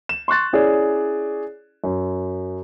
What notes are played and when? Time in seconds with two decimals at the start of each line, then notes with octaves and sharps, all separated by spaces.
0.09 E7
0.28 C6 C#6 F#6 A6
0.53 C#4 E4 G#4 C#5 D5
1.84 F#2